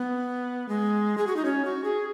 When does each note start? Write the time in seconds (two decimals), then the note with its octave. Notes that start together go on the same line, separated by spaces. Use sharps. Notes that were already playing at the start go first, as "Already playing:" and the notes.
Already playing: B3
0.69 G#3
1.18 G#4
1.27 F#4
1.36 D#4
1.45 C#4
1.65 F#4
1.84 G#4